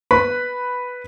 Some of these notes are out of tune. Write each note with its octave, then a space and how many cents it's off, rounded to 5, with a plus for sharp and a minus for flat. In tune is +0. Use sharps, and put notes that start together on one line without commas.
B4 +0 B5 +0